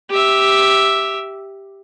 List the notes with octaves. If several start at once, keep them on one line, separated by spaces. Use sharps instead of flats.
G4 E5